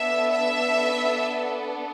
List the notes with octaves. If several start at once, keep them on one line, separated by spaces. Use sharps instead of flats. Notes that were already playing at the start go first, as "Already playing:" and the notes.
Already playing: B3 D4 A4 E5
E5